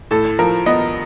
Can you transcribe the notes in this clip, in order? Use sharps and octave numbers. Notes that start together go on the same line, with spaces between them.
A2 A4
F3 A#4
B3 D#5